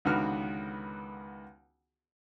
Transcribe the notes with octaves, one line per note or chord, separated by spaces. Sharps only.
C#2 D3 D#3 B3 F#4 F6